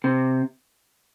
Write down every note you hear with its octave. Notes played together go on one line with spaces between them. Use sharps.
C3